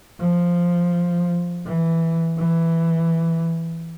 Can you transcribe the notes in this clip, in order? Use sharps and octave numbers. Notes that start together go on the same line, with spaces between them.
F3
E3
E3